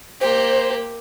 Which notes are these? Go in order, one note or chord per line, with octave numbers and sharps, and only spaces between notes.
A#3 G4 C5